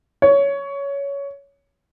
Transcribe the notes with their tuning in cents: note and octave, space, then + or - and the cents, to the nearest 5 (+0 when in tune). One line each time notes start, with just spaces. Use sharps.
C#5 +15